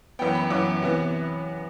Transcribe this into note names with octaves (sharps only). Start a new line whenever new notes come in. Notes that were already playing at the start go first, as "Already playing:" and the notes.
F#2 E3 B3 G5
B5
F#2 E3 B3 D6
C3 E3 B3